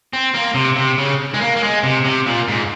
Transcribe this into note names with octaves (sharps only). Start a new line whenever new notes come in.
C4
A#3
C3
C3
C#3
G#3
A#3
A#3
G#3
C3
C3
A#2
G#2